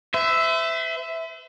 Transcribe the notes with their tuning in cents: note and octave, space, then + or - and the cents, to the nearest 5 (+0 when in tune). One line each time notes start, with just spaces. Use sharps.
C5 -45 E5 +0